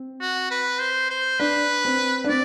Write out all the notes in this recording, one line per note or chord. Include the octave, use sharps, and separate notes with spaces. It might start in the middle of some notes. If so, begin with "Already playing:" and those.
Already playing: C4
F#4
B4
C5
C5
D4 B4
C4
D4
C4 D5